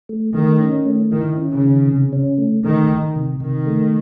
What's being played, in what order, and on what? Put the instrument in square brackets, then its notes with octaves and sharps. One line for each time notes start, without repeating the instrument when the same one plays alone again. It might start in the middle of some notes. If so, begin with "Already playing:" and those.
[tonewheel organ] A3
[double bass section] D#3 [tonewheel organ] A3
[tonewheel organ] C#4
A3
[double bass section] D#3 [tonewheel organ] E4
[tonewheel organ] C#4
[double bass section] C#3
[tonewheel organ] D#3
C3
C#4
A3
[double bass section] D#3 [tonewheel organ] A3
[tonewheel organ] D#3
C3
[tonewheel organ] C3 [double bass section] D#3
[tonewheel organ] A3